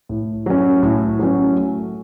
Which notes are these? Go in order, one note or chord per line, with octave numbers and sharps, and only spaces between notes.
A2
F#3 C#4
A2
F#3 C#4
A3